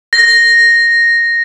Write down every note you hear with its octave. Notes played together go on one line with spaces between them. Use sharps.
A#6